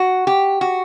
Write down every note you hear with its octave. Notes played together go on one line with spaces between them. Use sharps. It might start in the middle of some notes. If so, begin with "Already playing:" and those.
Already playing: F#4
G4
F#4